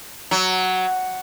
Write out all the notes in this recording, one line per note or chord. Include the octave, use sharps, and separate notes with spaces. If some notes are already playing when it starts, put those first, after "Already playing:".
F#3